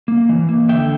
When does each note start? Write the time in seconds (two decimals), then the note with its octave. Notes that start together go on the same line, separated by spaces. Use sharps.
0.08 A#3
0.29 E3
0.49 A#3
0.69 D3 E5 G5